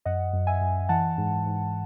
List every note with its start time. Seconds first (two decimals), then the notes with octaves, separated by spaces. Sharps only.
0.05 F#2 D#5 F#5
0.33 F#2
0.47 E5 G#5
0.61 F#2
0.89 E3 F#5 A5
1.18 G#2
1.46 G#2